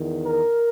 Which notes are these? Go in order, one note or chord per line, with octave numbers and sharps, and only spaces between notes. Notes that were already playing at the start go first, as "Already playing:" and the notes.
Already playing: E2 D#3
A#4